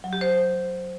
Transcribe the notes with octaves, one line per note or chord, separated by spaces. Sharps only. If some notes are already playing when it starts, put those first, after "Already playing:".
F#3
G4
C5